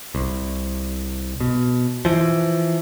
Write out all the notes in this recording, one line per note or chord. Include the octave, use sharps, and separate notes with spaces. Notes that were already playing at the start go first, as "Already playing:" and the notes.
C2
B2
E3 F3